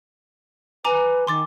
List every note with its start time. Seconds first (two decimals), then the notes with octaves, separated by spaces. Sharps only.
0.85 B4 G#5 A#5 D6
1.27 D#3 C6 D6 A6